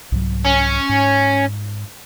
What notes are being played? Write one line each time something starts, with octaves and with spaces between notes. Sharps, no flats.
C2 G#2 F#3
C#4
G#2